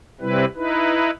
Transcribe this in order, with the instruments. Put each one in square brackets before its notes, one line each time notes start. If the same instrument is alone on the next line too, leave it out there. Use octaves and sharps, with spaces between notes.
[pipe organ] C3 G3 C4 E4 B4
D#4 E4 B4